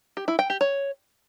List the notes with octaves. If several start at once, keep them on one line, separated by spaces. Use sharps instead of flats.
G4
E4
G5
G4
C#5